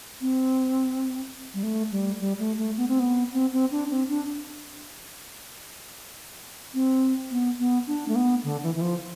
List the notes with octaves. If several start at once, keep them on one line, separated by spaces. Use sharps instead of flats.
C4
G3
A3
G3
G3
A3
A3
B3
C4
B3
C4
C4
D4
C4
D4
C4
B3
B3
D4
A3
B3
D3
E3
E3
F3